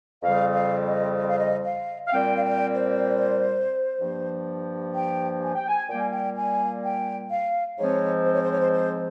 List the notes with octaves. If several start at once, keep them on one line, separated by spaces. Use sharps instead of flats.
F2 C#3 G3 C4 F5
F5
D#5
D#5
F5
D#5
F5
F5
A#2 G3 C4 G5
F5
G5
C5
G2 F3 A#3
G5
G#5
G5
G#5
A#2 G3 A#3 G5
G#5
G5
G#5
G5
F5
G#2 F3 G#3 C4 C#5
C5
C#5
C5
C#5
C5
C5